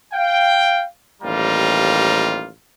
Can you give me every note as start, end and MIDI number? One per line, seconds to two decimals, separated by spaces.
0.14 0.85 77
0.14 0.85 79
1.23 2.49 33
1.23 2.49 39
1.23 2.49 55
1.23 2.49 65
1.23 2.49 82